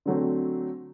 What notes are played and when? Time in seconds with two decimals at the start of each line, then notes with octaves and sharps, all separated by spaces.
0.06 D3 F#3 A3 C4